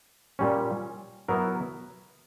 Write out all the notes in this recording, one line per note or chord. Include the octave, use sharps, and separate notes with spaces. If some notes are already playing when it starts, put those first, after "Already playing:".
A#2 G3 C#4
F#3 B3 E4 A#4